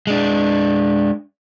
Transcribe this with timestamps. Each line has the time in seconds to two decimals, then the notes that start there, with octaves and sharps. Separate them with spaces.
0.07 G#3 D4